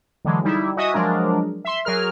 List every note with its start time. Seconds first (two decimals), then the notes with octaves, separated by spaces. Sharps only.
0.25 D3 E3 F#3 G#3
0.44 G3 D#4 E4
0.77 F#4 D#5 E5 G#5 D#6
0.94 F3 F#3 G#3 D4 A#4
1.65 E5 C6
1.85 F#3 G#4 A#4 F6